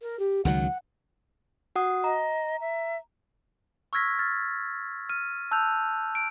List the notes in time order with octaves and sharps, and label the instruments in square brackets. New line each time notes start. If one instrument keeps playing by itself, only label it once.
[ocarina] A#4
G4
[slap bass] C#2 D#3 F#3 [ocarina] F#5
[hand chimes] F#4 F#5 D#6
[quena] D#5 [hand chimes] A#5
[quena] E5
[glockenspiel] C#6 E6 F6 G#6 A#6 B6
F6 A6
F6 D#7
A5 E6 F#6 G6 F7
D7